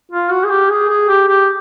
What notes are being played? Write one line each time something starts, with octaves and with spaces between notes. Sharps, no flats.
F4
F#4
G#4
G4
G#4
G#4
G4
G4